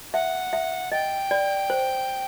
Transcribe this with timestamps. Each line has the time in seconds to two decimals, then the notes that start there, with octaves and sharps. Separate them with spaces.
0.13 E5 F#5
0.53 E5
0.92 D#5 G5
1.31 D5
1.70 C5